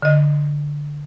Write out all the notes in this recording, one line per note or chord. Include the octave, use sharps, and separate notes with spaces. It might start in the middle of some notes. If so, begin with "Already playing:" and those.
D3 D#5